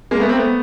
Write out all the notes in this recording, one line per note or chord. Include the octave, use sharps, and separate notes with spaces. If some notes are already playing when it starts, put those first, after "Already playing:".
G#3 A#3
A3 B3
A#3 C4
A3 B3